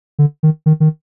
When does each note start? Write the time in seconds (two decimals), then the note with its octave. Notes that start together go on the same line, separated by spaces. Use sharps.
0.19 D3
0.43 D#3
0.66 D#3
0.80 D#3